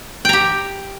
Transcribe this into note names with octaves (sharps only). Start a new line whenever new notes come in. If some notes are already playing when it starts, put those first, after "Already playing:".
G4 G5 A#5